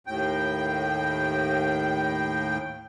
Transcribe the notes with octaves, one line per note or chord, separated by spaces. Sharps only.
D#2 A2 G5